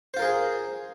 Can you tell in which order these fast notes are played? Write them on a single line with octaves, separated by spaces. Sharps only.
C5 F4 A#4 G#4